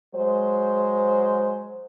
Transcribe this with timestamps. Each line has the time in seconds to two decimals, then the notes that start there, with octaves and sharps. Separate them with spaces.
0.14 F#3 G#3 C5